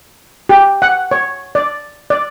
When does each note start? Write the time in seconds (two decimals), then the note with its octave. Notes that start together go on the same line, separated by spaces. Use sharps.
0.49 G4
0.82 F#5
1.11 C#5
1.55 D5
2.10 D5